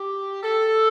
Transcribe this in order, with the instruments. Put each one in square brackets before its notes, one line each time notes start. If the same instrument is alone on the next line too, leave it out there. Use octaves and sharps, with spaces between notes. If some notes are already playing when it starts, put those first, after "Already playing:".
Already playing: [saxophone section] G4
A4